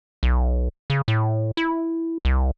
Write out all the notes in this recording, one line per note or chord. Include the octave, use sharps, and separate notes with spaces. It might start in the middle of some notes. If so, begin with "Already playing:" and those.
B1
C#3
A2
E4
C2